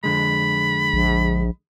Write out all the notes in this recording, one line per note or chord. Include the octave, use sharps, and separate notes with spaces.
F2 D3 G#3 B5
A#1